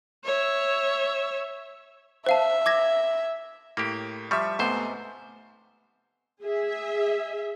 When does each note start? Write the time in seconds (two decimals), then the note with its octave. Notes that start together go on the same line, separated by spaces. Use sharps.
0.24 C#5 E5
2.26 C5 E5 F5 A5
2.66 D6 G#6 A#6
3.77 A2 A#3 G4
4.31 F3 G3 E5 C#6
4.59 G#2 C3 A3 B3 C5
6.42 G#4 E5